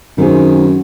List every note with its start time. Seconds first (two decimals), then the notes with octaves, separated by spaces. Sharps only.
0.18 F#2 D#3 C4 G#4